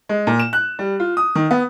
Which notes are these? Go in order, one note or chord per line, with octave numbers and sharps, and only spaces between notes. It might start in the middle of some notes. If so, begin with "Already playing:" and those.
G#3
A#2
E7
F#6
G3
F4
D#6
D#3
B3